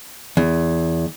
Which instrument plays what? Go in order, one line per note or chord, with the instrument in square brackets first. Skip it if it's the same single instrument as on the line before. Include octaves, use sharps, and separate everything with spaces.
[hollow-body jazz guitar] E2